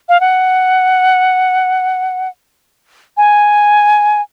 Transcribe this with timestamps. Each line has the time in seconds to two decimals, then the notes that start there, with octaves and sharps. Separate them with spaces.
0.09 F5
0.21 F#5
3.17 G#5